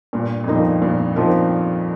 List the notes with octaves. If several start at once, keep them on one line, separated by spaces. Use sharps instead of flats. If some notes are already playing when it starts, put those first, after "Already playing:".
G2 A#2
F2
G2 F3 C4 D#4 A#4
G2 A#2
F3 C4 D#4 A#4